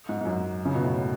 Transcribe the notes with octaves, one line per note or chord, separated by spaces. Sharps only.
G#2
G#2
F#2
C#3
B2
A2